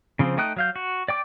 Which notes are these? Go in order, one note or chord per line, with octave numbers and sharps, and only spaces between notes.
C#3 F3 C4
A3 D#4 G5 D#6 F#6
F#3 F5 G6
F#4
D5 G5 D6